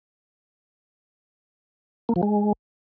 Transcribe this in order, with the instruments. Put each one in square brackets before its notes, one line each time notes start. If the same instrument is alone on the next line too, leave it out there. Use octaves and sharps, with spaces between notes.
[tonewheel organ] A#3
F3
G#3